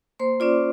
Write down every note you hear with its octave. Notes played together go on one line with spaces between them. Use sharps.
A#3 C5 C6
C#4 F4 D5 D6